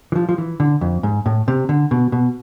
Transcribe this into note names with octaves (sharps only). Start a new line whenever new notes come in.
E3
F3
F3
E3
D3
F2
G#2
A2
C3
D3
B2
B2